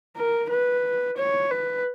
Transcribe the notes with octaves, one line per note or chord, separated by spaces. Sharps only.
A#4
B4
C#5
B4